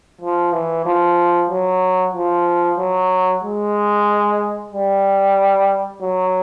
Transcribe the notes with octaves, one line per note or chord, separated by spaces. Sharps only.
F3
E3
F3
F#3
F3
F#3
G#3
G3
F#3